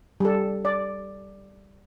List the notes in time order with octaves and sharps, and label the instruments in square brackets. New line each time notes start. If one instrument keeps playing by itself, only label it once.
[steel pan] G3 A4
D5